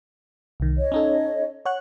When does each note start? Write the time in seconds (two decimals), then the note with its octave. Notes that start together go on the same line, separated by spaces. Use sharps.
0.60 C2 D#3
0.77 C#5 D#5
0.92 C#4 D#4 A4
1.66 C#5 F#5 F#6